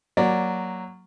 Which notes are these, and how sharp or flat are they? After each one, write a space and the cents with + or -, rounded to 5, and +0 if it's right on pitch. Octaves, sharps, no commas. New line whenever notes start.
F#3 +0 A#3 +0 D5 +0